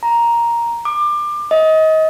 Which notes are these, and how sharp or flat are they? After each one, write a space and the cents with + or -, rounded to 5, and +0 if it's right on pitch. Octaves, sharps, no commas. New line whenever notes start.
A#5 +5
D6 +25
D#5 +25